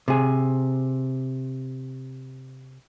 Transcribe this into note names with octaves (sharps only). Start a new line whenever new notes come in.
C3 G#4